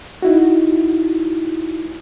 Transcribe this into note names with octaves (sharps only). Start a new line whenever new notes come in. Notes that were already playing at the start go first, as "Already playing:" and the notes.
D#4 E4 F#4